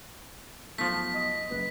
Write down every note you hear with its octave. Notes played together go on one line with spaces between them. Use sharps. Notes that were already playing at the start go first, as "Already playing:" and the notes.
B1 F3 A3 B6
D#5
F#1 B4